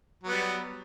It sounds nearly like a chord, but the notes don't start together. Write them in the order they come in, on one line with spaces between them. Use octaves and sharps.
F#3 B3 G3